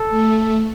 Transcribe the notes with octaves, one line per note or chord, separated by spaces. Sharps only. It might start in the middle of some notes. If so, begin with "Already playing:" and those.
Already playing: A4
A3